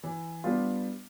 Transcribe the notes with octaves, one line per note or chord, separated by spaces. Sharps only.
E3
G3 B3 D4 F4